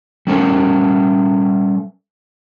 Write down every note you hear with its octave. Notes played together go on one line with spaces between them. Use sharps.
G3 C#4 A4 A#4